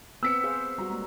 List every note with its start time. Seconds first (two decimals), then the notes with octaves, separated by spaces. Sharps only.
0.23 B3 C4 C5 E6 B6 C#7
0.44 G#4 C5 F5
0.78 G3 F#4 A#5
0.90 G#3 A#3